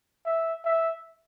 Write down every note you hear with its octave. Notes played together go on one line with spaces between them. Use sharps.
E5
E5